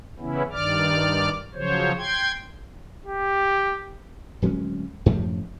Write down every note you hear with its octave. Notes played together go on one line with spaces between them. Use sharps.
C#3 E3 B3 C#4 E4
G2 D#3 D5 D6 F6
C#3 F3 F#3 C5 C#5
G5 C6 G#6
G4
D1 F#3 G#3 C#4
F#2 A2 C3 F3